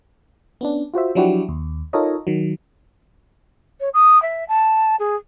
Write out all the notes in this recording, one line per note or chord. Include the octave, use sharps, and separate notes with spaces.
B3 C#4 D4
F4 F#4 C5 E5
F3 F#3 D4 E4 F#4 G4
D#2
D#4 F4 A4 A#4 C#5 D#5
D#3 F#3
C#5
D#6
E5
A5
G#4